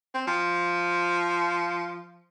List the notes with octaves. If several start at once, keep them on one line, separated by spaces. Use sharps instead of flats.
C4
F3